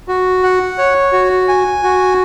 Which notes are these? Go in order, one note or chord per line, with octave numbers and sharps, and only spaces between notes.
F#4
F#5
C#5
F#4
G#5
F#4